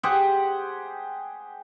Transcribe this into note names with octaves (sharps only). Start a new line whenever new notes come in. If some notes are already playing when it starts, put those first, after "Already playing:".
G4 G#4 C5 F#5